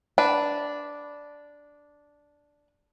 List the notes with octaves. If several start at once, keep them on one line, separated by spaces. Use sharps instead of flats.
D4 B4